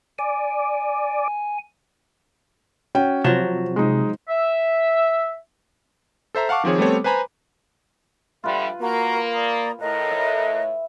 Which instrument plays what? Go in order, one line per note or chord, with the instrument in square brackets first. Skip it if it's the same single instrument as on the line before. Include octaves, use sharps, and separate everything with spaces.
[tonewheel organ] D5 [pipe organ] G#5
[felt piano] C#4 F#4 G5
[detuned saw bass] C3 [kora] F3 F#3 F#4 [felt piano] E7
[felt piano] G#3 D#4
[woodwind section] E5
[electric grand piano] A4 C5 E5 A#5
F5 F#5 A5 C#6 D6
D#3 F3 C4 G#4 C#5
G3 A3 B3 C4 A4 C#5
B4 C5 G#5 A#5 B5
[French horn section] D3 G3 [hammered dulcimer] F4 B4 [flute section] E5
[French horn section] A#3 [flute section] F#4 A#4 A#5
[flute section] D5 A#5 D#6
[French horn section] A2 [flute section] A#4 D#5 F#6
[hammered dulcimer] E5